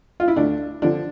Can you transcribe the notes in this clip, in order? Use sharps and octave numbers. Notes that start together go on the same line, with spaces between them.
F4
E4
D2 D4
D3 F3 D4